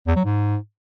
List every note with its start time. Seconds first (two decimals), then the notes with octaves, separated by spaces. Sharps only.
0.07 E2
0.16 F#3
0.25 G#2